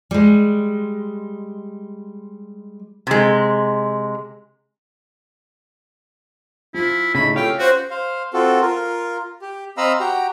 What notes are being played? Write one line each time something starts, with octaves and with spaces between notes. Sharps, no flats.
G3 G#3
C3 G#3
F3 E4 F4
A2 C#3 A3 D#4 B5
C#4 F4 G4 A4 F5 G5
F#4 C5
C5 F5
C4 F4 F#4 A4
F4 A#4
G4
C4 D#5 F5 A#5 B5 E6
F#4 G4 G5 A#5